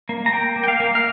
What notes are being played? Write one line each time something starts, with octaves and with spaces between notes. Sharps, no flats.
A#3
A#5
A#3 G5
A#3
G5
F5
A#3
F5